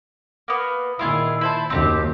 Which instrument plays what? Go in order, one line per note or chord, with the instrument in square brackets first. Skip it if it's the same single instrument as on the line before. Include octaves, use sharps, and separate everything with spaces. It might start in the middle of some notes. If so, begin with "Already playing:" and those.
[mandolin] A#3 B3
[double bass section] A#2 D#3 [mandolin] E4 F4 G#4
[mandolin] E4 C5 A5
[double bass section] F#1 D#2 D#3 [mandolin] C4 D#4 G4